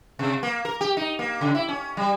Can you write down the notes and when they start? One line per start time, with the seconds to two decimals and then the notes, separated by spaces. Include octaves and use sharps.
0.19 C3
0.43 A#3
0.65 A#4
0.81 G4
0.97 D#4
1.19 A#3
1.41 C#3
1.55 E4
1.69 C#4
1.97 G3